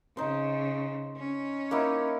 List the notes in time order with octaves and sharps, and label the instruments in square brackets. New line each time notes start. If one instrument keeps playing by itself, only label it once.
[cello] C#3 [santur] D#4 C5
[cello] C#4
[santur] A#3 D#4 E4